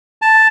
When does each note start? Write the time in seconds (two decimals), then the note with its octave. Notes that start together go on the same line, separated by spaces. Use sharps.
0.22 A5